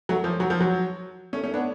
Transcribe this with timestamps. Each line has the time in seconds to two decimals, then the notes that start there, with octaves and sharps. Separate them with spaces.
0.09 F#3 A3
0.24 F3
0.40 F#3
0.50 F3
0.60 F#3
1.33 A3 C#4
1.44 A3 C#4
1.54 B3 D4